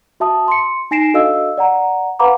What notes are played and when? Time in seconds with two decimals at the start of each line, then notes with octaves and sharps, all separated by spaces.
0.20 F#4 E5 A5 D#6
0.48 C6 C#7
0.91 D#4 G#5 A#6 C7 D7 E7
1.14 D4 F#4 A4 D#5 F5 E6
1.58 D5 F#5 A#5
2.19 B4 F5 F#5 A#5 B5 D6